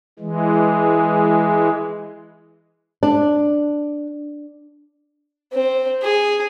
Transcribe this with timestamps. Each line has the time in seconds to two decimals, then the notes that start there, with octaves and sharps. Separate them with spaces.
0.19 E3 G#3
3.03 D4
5.53 C4
6.02 G#4